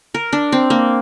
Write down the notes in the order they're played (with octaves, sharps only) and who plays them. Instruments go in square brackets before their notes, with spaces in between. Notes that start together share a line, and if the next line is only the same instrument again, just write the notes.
[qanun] A#4
D4
C4
A#3